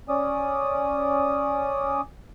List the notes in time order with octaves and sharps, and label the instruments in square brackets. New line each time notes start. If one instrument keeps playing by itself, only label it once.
[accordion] C#4 D5 D#6